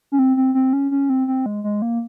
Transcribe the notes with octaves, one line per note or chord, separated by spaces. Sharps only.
C#4
C4
C4
C4
C#4
C#4
C4
C4
G#3
G#3
A#3